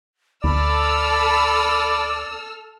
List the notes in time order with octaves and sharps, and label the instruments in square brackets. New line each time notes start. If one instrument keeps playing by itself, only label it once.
[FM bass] D2 [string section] A4 E6 F6 [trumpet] D5 [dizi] B5